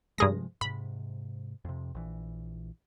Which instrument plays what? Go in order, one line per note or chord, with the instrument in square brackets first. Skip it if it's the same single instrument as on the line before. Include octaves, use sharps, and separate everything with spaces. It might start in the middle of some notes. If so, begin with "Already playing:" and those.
[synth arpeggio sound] G2 G#4 A#6 [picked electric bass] C3 F3 G#3
[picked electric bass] G#2 C3 [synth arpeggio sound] B5
[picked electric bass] F2 C3
A#1 E3